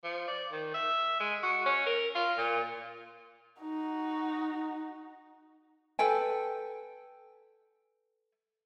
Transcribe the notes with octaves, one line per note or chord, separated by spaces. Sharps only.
F3
D5
D#3
E5
G#3
F#4
C#4
A#4
F4
A#2
D#4 F#4
A4 B4 G5 G#5